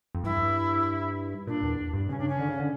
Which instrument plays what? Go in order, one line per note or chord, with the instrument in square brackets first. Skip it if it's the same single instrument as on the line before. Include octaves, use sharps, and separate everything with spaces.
[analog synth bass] F2
[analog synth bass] G2 [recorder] E4
[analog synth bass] A#2 [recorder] D4
[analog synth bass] E2
G2
[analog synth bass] C#3 [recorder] C#4
[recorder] D4
C#4
[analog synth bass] D3
C#3
D3